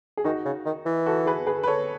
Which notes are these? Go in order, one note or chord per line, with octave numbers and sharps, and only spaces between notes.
G#4
D#3 D#4 F#4
C#3
D#3
E3
F#4 A4
G#4 B4
G#4 B4
B4
A4 C#5